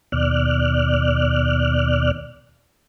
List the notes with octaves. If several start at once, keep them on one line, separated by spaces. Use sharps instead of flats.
D#2 B2 D5 F6 F#6